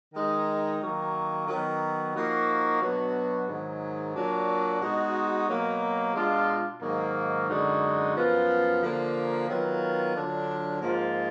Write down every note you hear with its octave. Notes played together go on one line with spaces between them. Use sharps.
D#3 G#3 D#4
D#3 F#3 A#3
D#3 F#3 B3
F3 A#3 D#4 F#4
B2 F#3 B3 D4 F#4
G#2 D#3 F#3
A#2 F#3 D4 F#4
B2 G#3 D#4 F#4
B2 F#3 A#3
B2 G#3 D4 F4
G#2 D#3 F#3 A#3
F#2 D3 G#3 D#4 F#4
F#2 F3 B3 F4
D3 F3 A#3
D#3 F#3 B3 F4
D3 F#3 D4 F4
G#2 F3 A#3 F4